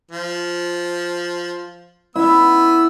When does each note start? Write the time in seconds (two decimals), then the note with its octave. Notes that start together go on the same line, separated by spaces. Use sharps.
0.11 F3
2.16 B3 E4 E6